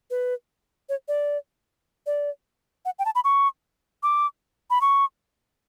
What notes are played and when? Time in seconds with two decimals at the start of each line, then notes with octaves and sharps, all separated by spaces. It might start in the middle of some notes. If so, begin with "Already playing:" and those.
0.10 B4
0.89 C#5
1.08 D5
2.06 D5
2.85 F#5
2.99 G5
3.05 A5
3.15 B5
3.24 C#6
4.03 D6
4.70 B5
4.81 C#6